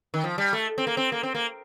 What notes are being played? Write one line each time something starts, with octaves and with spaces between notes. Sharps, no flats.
D#3
F3
G3
A3
C4
A#3
C4
A#3
C4
A#3